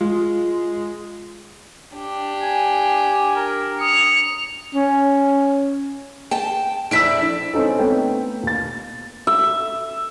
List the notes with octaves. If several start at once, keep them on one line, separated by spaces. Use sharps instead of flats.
G#3 F4
D4 G4
G#5
A#4
D#6 C#7 F7
C#4
G5 A5
F2 D4 E4 E6 B6 D7
C4 C#4 D#4 A4
A3 B3 G5
D#2 A6
E5